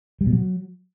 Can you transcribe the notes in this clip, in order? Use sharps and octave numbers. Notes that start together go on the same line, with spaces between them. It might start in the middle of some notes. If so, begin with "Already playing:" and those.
G3
B2
F#3